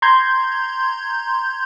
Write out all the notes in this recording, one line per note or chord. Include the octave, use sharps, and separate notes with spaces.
A#5 C6 G6 G#6